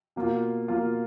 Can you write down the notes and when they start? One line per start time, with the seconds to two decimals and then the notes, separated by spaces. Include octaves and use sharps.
0.16 B2 A#3 F4
0.68 B2 A#3 F4